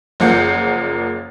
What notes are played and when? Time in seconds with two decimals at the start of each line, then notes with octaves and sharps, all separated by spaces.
0.20 F#1 F3 A#3 F#5 G6